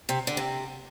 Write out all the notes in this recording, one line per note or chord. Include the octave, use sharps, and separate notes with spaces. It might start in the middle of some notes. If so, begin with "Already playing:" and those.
C3
D3
C3